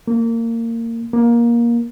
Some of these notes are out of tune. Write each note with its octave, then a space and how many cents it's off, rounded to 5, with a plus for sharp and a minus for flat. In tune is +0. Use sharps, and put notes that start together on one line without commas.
A#3 -25
A#3 +15